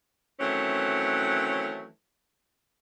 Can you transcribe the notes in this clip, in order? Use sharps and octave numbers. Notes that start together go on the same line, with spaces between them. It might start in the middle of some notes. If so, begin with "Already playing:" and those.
D#3 E3 F#3 A3 C4 C#4